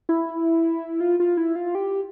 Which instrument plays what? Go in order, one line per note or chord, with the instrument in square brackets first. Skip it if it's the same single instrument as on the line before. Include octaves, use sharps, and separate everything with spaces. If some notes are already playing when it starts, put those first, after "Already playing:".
[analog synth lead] E4
F4
F4
E4
F4
G4